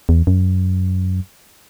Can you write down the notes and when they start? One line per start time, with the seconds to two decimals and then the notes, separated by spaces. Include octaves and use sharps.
0.09 E2
0.27 F#2